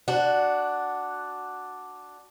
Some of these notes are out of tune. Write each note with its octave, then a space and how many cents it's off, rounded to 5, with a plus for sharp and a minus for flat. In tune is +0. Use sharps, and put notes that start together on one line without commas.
D4 +0 F#4 +0